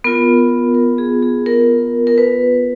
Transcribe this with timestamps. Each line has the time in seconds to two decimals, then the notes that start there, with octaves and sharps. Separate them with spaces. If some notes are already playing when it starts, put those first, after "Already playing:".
0.04 B3 F4 A#4
0.75 A#4
0.98 G#4
1.23 G#4
1.46 A#4
2.07 A#4
2.18 B4